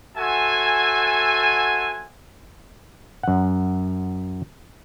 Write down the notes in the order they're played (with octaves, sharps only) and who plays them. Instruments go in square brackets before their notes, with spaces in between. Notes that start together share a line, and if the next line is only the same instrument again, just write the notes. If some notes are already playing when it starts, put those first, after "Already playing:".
[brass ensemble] F#4 A4 C5 E5 F#5 G#5
[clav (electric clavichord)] F#2 F#5